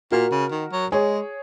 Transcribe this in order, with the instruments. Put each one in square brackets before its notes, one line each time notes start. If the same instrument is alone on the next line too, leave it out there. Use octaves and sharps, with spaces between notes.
[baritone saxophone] A#2 [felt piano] F#4 A#4
[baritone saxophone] C#3
D#3
F#3
[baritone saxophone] G#3 [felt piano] G#4 C#5